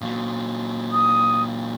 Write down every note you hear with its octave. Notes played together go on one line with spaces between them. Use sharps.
A#2 F#3
D#6